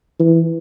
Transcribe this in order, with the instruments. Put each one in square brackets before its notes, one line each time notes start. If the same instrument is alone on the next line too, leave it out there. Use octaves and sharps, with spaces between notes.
[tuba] E3